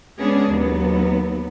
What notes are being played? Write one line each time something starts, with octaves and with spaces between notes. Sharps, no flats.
G#3 B3 C#4 D4 G#4
D#2 F#3 B3